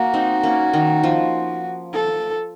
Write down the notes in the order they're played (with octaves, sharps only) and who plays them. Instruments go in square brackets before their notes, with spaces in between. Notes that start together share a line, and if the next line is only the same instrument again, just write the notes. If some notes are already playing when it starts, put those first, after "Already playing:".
Already playing: [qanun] A#3 [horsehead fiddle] F#4
[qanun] C4 D#4
A#3 C#4
D#3
F3
[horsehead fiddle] A4